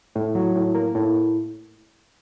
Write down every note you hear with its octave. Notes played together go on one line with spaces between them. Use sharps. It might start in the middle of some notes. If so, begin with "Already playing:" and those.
A2
F#3
A2
A#3
A2